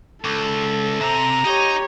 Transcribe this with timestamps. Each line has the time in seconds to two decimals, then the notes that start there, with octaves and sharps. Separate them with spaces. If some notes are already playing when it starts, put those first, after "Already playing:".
0.25 C#2 A4
1.01 C3 C4 A#5
1.45 D#4 G4 C#5 D#5